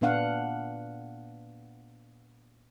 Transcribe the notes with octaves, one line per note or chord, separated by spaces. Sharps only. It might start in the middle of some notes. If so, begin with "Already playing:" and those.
A#2 B3 D4 F5 F#5